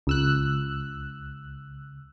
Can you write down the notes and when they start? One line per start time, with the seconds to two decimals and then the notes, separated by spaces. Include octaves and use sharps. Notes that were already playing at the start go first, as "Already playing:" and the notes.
0.07 C#2 E6 F#6